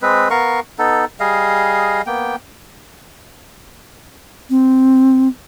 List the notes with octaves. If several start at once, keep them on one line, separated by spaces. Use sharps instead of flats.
G#3 C4 B4
B3 A#4 F5 C#6
B3 D#4 A4
G3 G#4 D#5 F5
A#3 B3 G5
C4